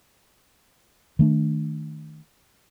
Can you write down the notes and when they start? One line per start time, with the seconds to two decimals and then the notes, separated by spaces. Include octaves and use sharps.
1.19 D#3 A3 D4